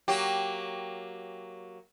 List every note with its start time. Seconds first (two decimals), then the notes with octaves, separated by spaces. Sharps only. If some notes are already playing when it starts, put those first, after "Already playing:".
0.08 F#3 A#3 G4